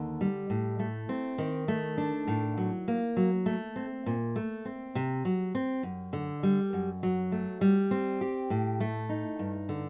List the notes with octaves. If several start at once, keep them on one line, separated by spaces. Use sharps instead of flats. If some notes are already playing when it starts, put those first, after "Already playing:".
Already playing: D#2 D3
G3
A2
A3
C4
D#3
A3
D4
A2
F#3
A#3
F#3
A3
C4
A#2
A3
C4
C3
F#3
C4
F#2
D3
G3
F#2
F#3
A3
G3
C4
G4
A2
A3
D#4
G2
D3